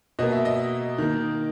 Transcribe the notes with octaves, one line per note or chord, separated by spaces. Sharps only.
B2 A#3 D#5
E5
D#5
D#3 A#3